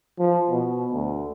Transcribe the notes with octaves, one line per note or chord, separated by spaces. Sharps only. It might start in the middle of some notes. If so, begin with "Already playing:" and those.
F3
B2
D2